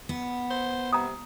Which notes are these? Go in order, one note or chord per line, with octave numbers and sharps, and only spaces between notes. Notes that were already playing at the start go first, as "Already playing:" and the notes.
B3
C5
C3 A#5 D#6